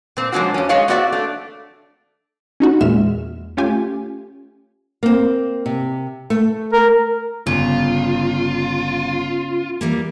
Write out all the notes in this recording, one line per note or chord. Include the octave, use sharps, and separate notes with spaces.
A#2 C4
F3 F#3 G#3 A#3 D4 F#4
F2 C#4
G#3 F#4 G#4 C#5 D#5 F5
A#3 C4 F#4 D5 E5
A3 D4
C#4 D#4 F#4
E2 A#2 G#3 E5 F6 E7
A3 C#4 F4 G4 G#5
A#3 C4
C3
A3
A#4
G1 C#3 F4
E3 G3 A#3